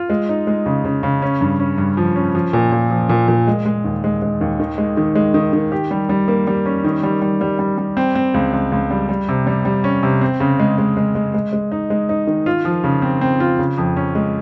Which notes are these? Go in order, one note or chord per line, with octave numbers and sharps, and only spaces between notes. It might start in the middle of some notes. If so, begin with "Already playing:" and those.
Already playing: F4
G#3
D#4
G#3
C#3
C#3
C#3
C#4
G2
C#4
G2
F3
C#4
F3
A#2
A#2
F3
A#2
A#2
G#3
G#3
D#2
G#3
G#3
D#2
D#3
G#3
D#3
G#3
D#3
D#3
G4
G3
G3
A#3
G3
C#4
D#3
G3
G3
G3
G3
G3
C4
C4
C#2
C#2
C#2
G3
G3
C3
G3
G3
C#4
C3
C4
C#3
G#3
G#3
G#3
G#3
G#3
G#3
D#4
G#3
D#4
D#3
F4
F3
C#3
C4
C4
F4
C#3
F2
C#4
G#3